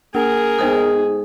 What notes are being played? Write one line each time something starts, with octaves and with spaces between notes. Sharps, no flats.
A#3 G#4 A#4
G#2 B3 A4 C5 D#6